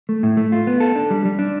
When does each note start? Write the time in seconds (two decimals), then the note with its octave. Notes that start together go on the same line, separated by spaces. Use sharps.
0.09 A3
0.23 A2
0.37 A3
0.52 F4
0.67 B3
0.80 A4
0.95 D4
1.10 G3
1.25 G3
1.39 D4